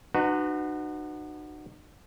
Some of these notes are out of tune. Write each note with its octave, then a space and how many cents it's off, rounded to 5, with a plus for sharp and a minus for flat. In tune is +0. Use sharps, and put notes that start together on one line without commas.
D#4 -45 F#4 +0 B4 +25